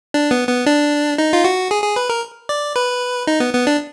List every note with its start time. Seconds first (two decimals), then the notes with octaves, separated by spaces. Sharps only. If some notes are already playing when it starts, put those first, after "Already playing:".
0.14 D4
0.31 B3
0.48 B3
0.66 D4
1.18 D#4
1.33 F4
1.44 F#4
1.71 G#4
1.83 G#4
1.96 B4
2.09 A#4
2.49 D5
2.76 B4
3.27 D#4
3.40 B3
3.54 B3
3.67 D4